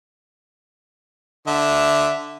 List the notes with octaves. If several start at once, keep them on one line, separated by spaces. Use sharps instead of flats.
D3 E5